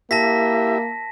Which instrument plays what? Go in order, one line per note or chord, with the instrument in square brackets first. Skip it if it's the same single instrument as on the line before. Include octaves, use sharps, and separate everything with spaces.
[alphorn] A#3 [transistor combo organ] E4 G4 E5 [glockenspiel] A5 A#6 B6